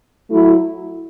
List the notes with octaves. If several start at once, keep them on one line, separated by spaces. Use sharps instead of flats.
F#3 A3 E4